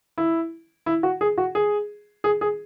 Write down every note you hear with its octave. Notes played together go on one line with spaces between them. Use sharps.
E4
E4
F#4
G#4
F#4
G#4
G#4
G#4